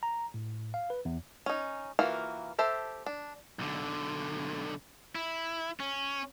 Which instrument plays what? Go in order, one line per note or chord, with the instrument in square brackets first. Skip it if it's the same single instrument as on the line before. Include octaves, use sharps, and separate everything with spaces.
[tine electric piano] A#5
A2
F5
B4
E2
[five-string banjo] C#4 D#4
E3 A#3 F4 F#4
G4 A4 C5 E5
D4
[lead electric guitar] B1 D3
E4
C#4